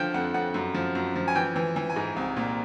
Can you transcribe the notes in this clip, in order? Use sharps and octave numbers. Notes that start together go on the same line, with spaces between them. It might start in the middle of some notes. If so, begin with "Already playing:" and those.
Already playing: D3 F3 G5
F2 F#5
F2 F#5
F#2
F3
F#2
F3
G#5
E3 G5
E3
E3
G#5
G#2
C2
A#2